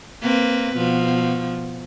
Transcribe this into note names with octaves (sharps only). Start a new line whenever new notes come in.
A#3 C4 B4
B2 F3